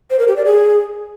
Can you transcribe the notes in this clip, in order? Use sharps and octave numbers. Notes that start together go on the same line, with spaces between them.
C5
A#4
G4
D5
G#4